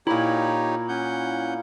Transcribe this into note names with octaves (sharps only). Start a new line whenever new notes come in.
A#2 D#4 E4 G4 C#5 A#5
C#4 F#5 G6